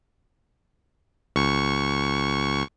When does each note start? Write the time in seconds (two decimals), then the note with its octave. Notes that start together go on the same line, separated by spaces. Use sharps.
1.36 C#2 C#6